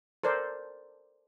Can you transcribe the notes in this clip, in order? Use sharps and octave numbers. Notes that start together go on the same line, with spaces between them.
A4 A#4 C5 D5